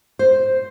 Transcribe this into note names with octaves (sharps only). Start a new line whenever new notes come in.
C5